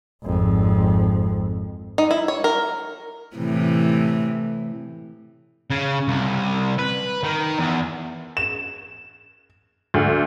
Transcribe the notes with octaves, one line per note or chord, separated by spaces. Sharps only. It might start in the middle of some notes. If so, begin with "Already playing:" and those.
G#1 F2
D#4
E4
C#5
A#4
A2 C3 E3
C#3
C2
B4
D#3
E2
E7
D2